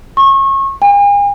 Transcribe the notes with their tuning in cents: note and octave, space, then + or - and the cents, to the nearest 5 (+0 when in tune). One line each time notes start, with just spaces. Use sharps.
C#6 -30
G#5 -45